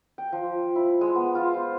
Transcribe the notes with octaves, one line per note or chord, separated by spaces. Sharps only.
G5
F3
E4
G#3
B3
F4
C5